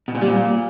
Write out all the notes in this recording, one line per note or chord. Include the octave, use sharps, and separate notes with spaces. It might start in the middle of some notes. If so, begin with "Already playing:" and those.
B2
A#2
G3
A#2